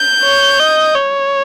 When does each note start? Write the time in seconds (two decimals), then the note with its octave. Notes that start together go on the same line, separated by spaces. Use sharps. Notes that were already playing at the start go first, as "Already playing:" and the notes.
Already playing: G6
0.23 C#5
0.60 D#5
0.95 C#5